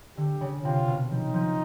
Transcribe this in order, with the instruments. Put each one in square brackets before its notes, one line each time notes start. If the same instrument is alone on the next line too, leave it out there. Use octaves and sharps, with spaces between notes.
[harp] D3 [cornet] G4
[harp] C#3
[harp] C3 [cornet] F4
[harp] B2
[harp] F3 [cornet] D#4
[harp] F3